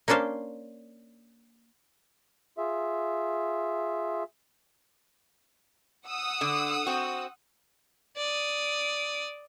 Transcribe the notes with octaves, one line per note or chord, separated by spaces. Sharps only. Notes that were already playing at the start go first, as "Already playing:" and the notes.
A#3 C#4 D4 C5 F5
F4 G#4 E5
F#5 D#6 E6
D3
C4 F#4
D5 D#6